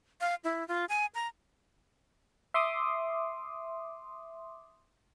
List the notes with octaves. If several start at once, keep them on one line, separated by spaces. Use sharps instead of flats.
F5
E4
F4
G#5
A#5
E5 C6 D6 D#6